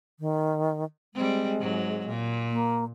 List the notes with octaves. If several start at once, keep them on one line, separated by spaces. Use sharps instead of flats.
D#3
G3 G#3 C4
G#2 F#3
A#2
A#3